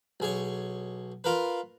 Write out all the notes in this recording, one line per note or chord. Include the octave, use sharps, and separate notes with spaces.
B1 G#4 C#5
F4 A#4 B4